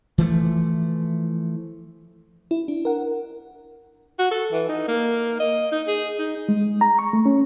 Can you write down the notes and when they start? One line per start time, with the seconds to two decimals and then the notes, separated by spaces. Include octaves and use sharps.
0.18 E3 F3 A3
2.51 E4
2.68 D4
2.85 A#4 F#5
4.19 F#4
4.31 A4
4.52 E3
4.69 D#4
4.88 A#3
5.40 D#5
5.72 D#4
5.88 G#4
6.19 D#4
6.49 G#3
6.81 A#5
6.99 C#6
7.13 A3
7.26 C#4